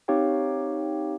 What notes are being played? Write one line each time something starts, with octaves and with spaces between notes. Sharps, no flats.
C4 D#4 G4 C#5 F5 G5